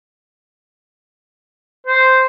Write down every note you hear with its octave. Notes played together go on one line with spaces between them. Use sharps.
C5